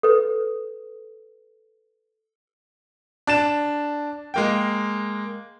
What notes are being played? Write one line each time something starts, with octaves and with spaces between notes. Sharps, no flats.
A4 B4
D4 A6 E7
G#3 A#3 G5